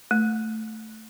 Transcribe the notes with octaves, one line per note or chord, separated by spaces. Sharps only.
A3